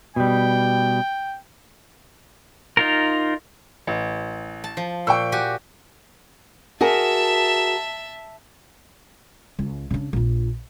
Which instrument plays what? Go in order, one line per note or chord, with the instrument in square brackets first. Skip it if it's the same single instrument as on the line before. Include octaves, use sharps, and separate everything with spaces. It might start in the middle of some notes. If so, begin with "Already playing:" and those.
[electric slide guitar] B2 G3 [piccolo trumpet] G5
[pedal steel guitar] D#4 F4 A#4
[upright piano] A1
[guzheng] A5
F3
[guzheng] A#2 [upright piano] G5 C#6 E6
[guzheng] F#4 G4 G#5
[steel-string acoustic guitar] F#4 G#4 A#4 [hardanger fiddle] E5 A5
[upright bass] C#2
C#3 D4
A#1 F4